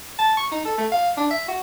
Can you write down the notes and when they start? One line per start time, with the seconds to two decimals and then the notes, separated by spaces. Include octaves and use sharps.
0.19 A5
0.37 C#6
0.51 D#4
0.65 A4
0.78 A3
0.92 F5
1.17 D4
1.30 E5
1.48 F#4